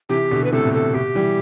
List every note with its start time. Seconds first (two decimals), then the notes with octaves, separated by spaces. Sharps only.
0.09 C3 E3 G4
0.31 B2 D3
0.44 B4
0.52 A2 C3 A4
0.66 B2
0.74 A4
0.94 B2 G4
1.15 E3 G3